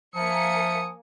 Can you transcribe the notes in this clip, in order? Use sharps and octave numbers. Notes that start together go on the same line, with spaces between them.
F3 A#3 E5 G#5 A#5 D#6 C#7